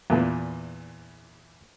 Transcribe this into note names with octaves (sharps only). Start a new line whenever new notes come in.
E2 A#2 E3